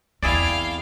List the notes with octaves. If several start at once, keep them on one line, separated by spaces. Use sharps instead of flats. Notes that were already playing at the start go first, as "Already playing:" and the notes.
E2 C4 E4 G#4 D5 F5 G5